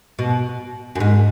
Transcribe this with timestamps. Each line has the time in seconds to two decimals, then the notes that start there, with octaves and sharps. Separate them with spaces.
0.19 B2
0.95 F#2
1.00 G#2